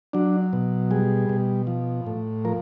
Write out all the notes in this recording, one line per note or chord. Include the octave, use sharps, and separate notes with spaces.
F#3 D4
B2
G3 G#4
B2
F3
A2
F3 A#4